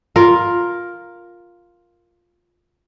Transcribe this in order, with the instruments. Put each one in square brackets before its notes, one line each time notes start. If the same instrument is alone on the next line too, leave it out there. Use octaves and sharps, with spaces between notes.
[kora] F4 A#4